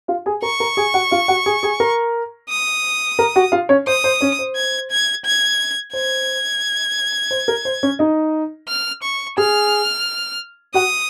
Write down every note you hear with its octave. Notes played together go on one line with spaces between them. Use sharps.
F4 F5
G#4 G#5
A#4 A#5 C#6
A#4 A#5
G#4 G#5
F#4 F#5
F4 F5
F#4 F#5
G#4 G#5
G#4 G#5
A#4 A#5
D#6
A#4 A#5
F#4 F#5
F4 F5
C#4 C#5
C5 D#6
C5
C#4 C#5
C5
G#6
G#6
G#6
C5 G#6
C5
A#4
C5
C#4 C#5
D#4 D#5
F6
C#6
G#4 G#5 F6
F#4 F#5 D#6